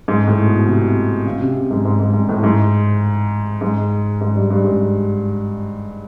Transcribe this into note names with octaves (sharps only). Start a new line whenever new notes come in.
G#2
A2
B2
C3
C#3
C3
G#2
G#2
G#2
G#2
A2
G#2
G#2
G#2
G2
G2
G#2